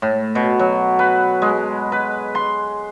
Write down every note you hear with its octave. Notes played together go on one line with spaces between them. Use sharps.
A2
B2
F#3
B4
G#3
B4
C6